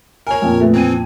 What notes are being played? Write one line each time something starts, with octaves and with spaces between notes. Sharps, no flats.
A#4 C#5 G#5 F7
F2 A#2 A#3
A3 B4
E3 C4 G#6 D#7